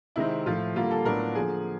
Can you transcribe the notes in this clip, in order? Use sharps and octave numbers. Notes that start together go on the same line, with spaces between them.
C3 D#3 G#3 C4 E4
A2 F3 A3 F4
D3 G3 A#3 F4
A4
A2 F#3 B3 D4 A#4
D3 F3 A#3 G#4